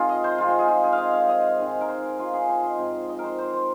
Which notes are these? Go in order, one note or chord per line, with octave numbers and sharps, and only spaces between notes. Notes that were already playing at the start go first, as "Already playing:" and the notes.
Already playing: D#3 G#3 C4 F4 G#4 A#4
D#5
C5
G#2 G#3 C4 F4
F4
G#4
F4
G#4
F5
D#5
F5
D#5
G#2 D#3 G#3 C4
A#4
C5
F4
G#4
C5
D#5
G#2 F3 C4
D#5
A#4 C5
C5
C5